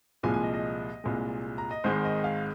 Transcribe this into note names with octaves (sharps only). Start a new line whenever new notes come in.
C2 A#2 F3 G#3 G#5
G#5
D#5
D#5
C2 A#2 G#3
A#5
D#5
G#1 G#2 D#3 G#3 C5
D#5
F5